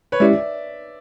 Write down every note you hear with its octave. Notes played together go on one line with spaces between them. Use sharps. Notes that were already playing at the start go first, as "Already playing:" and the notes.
B4 C#5
G#3 C#4 E4 G4 D5 E5